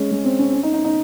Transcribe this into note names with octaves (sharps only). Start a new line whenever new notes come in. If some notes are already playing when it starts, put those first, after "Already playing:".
Already playing: G#3 C#4
G#3
C4
C#4
C#4
D#4
D#4
D#4